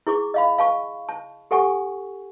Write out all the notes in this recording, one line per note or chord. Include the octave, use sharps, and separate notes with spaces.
E4 G#4 C#6 D6
D#5 F5 B5
F5 A5 C#6
A5
G4 A4 F#5 G#5 C#6